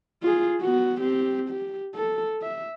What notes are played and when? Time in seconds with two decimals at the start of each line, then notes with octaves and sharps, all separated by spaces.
0.23 F4 G#4
0.61 B3 F#4
1.01 C4 G4
1.49 G4
1.95 A4
2.42 E5